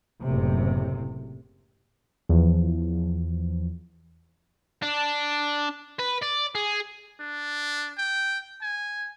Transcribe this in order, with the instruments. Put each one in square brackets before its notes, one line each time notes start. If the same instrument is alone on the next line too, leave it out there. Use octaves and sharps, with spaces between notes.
[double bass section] F#1 A2 C3
[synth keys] E2 F3
[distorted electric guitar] D4
B4
D5
G#4
[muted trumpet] D4
G5
G#5